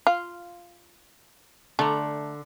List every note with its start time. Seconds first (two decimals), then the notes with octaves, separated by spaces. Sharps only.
0.07 F4
1.79 D3 A3 A#5